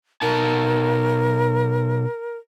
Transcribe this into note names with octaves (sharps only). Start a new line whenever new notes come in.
B2 D#4 A#4 A5